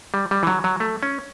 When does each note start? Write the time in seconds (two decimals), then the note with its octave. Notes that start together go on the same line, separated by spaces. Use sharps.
0.14 G3
0.31 G3
0.43 E3
0.47 F#3
0.64 F#3
0.80 A3
1.03 C#4